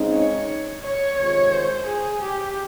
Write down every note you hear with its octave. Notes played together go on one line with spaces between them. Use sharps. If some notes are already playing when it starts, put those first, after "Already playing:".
Already playing: C#3 G#3 C4 D#4
C#5
C#5
C3 D#3 G#3 C4 F4 C#5
C5
G#4
G4